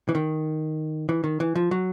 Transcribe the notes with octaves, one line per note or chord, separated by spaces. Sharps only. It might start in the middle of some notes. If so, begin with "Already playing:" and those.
E3
D#3
E3
D#3
E3
F3
F#3